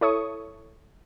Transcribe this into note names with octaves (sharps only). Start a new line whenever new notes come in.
E4 A4 C#5 C#6 D#6